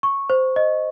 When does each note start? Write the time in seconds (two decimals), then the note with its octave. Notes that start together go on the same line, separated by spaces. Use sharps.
0.03 C#6
0.30 C5
0.56 D#5